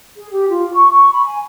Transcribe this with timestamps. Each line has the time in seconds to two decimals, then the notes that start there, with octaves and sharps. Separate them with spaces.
0.16 G#4
0.32 G4
0.49 F4
0.74 C#6
0.90 C#6
1.12 B5
1.25 G#5